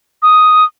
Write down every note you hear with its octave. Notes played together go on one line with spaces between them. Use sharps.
D#6